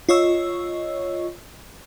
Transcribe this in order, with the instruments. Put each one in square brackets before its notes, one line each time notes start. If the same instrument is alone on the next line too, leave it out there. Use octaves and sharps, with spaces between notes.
[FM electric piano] F4 C#5 D#5 C#6 E6